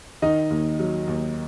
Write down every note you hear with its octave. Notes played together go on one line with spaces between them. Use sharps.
D#3 D#4 D#5
D#2
F#3
D#2